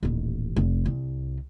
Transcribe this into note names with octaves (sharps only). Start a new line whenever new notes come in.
D#1 A1
F1
C2